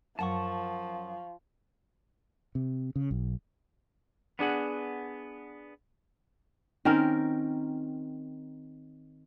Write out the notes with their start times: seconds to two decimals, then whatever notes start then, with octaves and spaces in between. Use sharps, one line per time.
0.19 F#2 F3 C#5 F#5 A5 C#6
2.55 C3
2.96 C#3
3.11 B1
4.39 B3 D4 G#4 F#5
6.85 D#3 C4 C#4 A#4